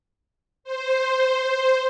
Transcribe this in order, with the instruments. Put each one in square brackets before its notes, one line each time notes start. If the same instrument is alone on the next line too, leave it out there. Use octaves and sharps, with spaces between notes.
[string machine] C5